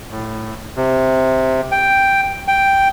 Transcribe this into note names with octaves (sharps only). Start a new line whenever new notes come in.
A2
C3
G5
G5